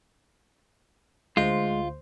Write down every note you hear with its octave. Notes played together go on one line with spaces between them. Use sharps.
D2 G#3 F4 C5